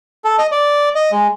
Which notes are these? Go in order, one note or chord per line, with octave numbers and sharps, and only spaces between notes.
A4
D#5
D5
D#5
G#3